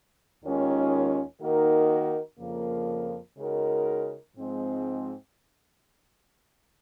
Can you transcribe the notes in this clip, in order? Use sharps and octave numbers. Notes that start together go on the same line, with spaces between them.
D#2 D#3 G#3 C#4 F4
D#3 A#3 D#4 F#4 A#4
F2 C#3 F3 A#3
C#3 G#3 D#4 F#4 A#4
G#2 F3 G#3 C4